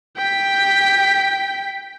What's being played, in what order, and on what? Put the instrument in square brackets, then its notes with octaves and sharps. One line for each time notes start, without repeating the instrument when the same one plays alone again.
[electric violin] G5 B6